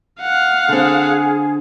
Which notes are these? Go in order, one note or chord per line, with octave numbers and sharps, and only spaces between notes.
F5 F#5
D3 C4 G#4